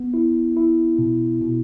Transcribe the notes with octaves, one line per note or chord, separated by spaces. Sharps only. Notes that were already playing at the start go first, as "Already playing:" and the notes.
Already playing: B3
E4
E4
B2
B2